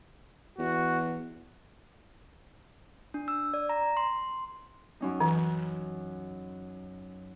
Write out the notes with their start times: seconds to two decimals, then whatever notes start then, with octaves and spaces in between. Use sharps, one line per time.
0.59 E2 F#4
3.14 D4
3.28 E6
3.54 D5
3.69 A#5
3.97 C6
5.00 F#2 C#4 D#4
5.21 E3